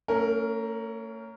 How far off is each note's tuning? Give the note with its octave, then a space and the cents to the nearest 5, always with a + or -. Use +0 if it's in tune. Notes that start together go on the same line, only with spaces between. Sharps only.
A3 +45 C#4 +5 A#4 +0